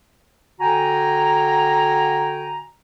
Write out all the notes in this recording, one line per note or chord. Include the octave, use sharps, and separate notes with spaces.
D3 F#4 G5 G#5 A#5